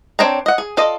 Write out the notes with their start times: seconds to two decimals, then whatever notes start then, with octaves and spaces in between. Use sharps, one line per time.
0.19 C4 D4 C#5 G5 A#5
0.46 D#5 F#5
0.58 G#4
0.77 F4 A4 D5 D#5